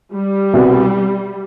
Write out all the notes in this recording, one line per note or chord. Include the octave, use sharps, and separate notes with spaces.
G3
C2 B2 B3